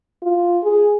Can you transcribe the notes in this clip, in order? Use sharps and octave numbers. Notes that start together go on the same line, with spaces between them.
F4
G#4